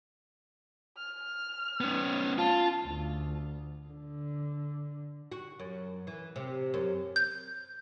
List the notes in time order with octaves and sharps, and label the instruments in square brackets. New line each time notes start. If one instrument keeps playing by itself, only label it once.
[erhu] F6
[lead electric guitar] B3 C#4
[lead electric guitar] F4 [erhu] A5
[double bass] D2
D3
[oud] F#4
F#2
E3
C3
F#2
[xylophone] G6